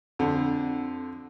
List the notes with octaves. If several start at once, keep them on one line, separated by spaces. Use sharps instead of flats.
F2 D3